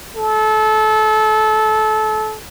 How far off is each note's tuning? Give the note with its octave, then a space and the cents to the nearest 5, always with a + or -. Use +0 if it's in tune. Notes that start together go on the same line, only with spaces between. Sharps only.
A4 -25